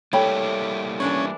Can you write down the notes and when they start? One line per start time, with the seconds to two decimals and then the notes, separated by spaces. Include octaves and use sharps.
0.13 G3 A3 A#3 E4 C#5 G5 B5
1.00 E3 C#4 D4 D5